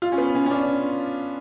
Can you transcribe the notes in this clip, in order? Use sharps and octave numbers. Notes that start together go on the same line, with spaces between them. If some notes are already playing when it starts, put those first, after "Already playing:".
F4
C#4
B3
C#4
C#4
D4